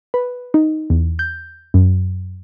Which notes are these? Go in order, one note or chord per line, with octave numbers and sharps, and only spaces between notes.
B4
D#4
E2
G6
F#2